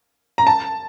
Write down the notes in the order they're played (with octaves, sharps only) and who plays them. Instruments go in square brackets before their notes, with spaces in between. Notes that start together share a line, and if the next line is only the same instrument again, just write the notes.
[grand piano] A#5
A5